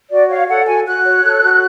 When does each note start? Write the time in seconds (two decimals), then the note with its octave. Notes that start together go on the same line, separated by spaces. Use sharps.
0.11 F#4 D5
0.29 C#5 F5
0.48 A4 F#5
0.67 F#4 G#5
0.86 F#4 F#6
1.05 C#5
1.24 A4
1.43 F#4